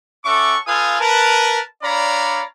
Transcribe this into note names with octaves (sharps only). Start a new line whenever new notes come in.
C#4 A4 E5 F#5 C#6 D6
F4 A4 B4 F5 G#5 D#6
A#4 B4 A5
D4 C#5 D5 F5 A#5 B5